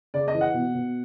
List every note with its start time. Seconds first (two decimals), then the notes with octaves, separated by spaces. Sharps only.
0.14 C#3 D5
0.28 D#5
0.34 E3
0.41 F#5
0.54 B2
0.75 B2